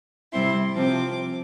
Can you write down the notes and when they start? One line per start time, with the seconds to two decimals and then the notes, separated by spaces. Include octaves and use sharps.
0.32 C3 G3 C4 E4 C6
0.76 C3 F3 C4 D6